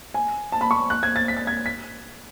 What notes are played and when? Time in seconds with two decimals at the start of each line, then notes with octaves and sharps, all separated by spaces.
0.14 G#5
0.52 A5
0.61 B5
0.71 C#6
0.90 F#6
1.03 G#6
1.16 A6
1.28 B6
1.37 A6
1.47 G#6
1.66 B6